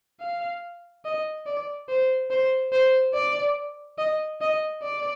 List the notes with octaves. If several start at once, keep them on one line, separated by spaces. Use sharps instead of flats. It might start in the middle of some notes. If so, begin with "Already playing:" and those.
F5
D#5
D5
C5
C5
C5
D5
D#5
D#5
D5